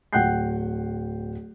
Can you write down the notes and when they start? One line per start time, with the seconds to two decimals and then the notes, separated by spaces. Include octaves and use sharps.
0.13 D1 F#5 G5 F#6 G6 C7